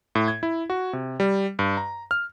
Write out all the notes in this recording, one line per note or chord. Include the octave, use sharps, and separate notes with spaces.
A2
G#6
E4
F#4
C3
G3
G2
A#5
F6